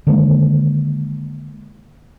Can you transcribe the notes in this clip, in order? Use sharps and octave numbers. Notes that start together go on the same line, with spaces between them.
D3 D#3 G#3 A#3